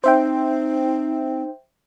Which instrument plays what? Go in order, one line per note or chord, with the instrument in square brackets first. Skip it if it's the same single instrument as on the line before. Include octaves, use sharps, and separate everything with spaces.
[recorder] C4 [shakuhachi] D#4 [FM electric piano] C5 E5 G5